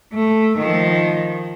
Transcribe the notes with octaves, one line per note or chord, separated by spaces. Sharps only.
A3
D#3 F3